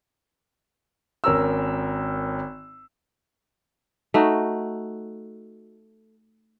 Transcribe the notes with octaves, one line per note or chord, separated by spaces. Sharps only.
G#1 C#4 A#4 E6
A3 D#4 F#4